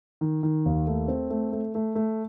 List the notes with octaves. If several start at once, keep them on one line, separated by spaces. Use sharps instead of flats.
D#3
D#3
D#2
A3
C4
A3
A3
A3
A3